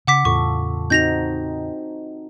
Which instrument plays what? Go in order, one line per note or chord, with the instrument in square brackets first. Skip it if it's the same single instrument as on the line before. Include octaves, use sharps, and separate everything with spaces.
[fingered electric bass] C#3 [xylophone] F#5 D6 B6
[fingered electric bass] E2 A2 C#3 [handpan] F4 A4 [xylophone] C#6
[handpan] C4 D#4 F#4 [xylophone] G6 A#6 F7